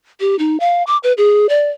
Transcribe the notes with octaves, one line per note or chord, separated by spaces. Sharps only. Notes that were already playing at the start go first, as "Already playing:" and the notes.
G4
D#4
F5
D6
B4
G#4
D5